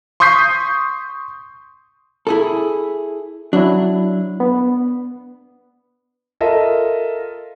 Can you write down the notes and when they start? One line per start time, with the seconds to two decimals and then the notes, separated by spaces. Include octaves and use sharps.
0.20 C6 C#6 D#6 G6 B6 C7
2.27 E4 G#4 A4
3.53 F#3 D4 E4
4.40 B3
6.41 F4 A4 A#4 D#5 E5